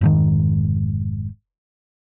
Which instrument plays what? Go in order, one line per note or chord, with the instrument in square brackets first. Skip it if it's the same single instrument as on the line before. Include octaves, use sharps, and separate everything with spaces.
[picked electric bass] F1 G#2 D#3